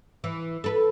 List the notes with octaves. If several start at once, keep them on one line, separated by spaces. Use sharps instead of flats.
E3
A4 B4